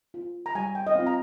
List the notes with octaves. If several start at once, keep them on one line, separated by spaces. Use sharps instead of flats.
F4
A#5
G3 G#5
G5
D#5
C4 F4 F5
A#5